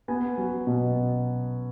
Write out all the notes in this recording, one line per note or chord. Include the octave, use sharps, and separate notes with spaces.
B3 G#5
F#3
B2